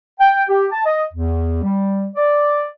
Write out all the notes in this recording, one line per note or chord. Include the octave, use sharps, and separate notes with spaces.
G5
G4
A5
D#5
E2
G3
D5